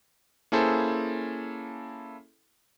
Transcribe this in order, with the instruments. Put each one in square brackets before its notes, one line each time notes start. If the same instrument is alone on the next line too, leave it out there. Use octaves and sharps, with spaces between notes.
[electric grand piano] A#3 C#4 E4 G#4 A4 C5